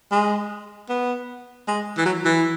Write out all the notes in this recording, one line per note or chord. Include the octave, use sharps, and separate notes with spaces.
G#3
B3
G#3
E3
F#3
E3